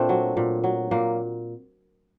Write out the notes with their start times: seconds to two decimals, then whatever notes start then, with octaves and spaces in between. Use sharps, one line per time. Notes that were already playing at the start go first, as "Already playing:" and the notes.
Already playing: A#2 A3 C4 D4
0.09 F#3
0.37 A#2
0.64 F#3
0.91 A#2 A#3